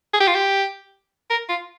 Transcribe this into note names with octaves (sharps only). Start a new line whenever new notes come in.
G#4
G4
F4
G4
A#4
F4